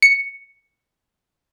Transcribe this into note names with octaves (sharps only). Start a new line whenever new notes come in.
C#7